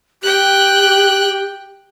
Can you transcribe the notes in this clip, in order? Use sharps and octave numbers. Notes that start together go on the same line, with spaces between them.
G4 G5 F#6